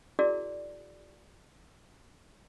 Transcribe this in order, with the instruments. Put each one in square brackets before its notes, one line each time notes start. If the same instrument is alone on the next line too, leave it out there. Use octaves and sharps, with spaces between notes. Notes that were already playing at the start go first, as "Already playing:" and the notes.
[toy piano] E4 F#4 G#4 A#4 D5